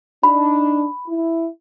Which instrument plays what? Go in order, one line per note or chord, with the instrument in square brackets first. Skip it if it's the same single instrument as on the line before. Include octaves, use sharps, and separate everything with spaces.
[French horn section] D4 D#4 [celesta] B5
[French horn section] E4